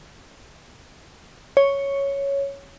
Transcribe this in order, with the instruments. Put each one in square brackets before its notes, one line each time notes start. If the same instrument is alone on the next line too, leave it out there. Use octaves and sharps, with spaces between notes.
[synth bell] C#5